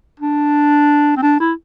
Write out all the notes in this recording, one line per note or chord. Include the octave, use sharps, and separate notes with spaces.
D4
C4
D4
E4